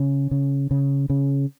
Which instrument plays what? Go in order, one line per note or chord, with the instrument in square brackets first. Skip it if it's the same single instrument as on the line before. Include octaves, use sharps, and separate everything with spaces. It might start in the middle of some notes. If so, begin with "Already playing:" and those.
Already playing: [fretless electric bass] C#3 C#4
C#3
C#3
C#3